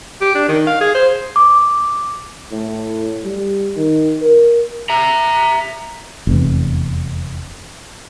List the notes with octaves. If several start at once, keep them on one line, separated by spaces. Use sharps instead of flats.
G4
D4
D#3
F5
G#4
C5
D6
A2
G3
D#3
A#4
E5 A#5
F1 E2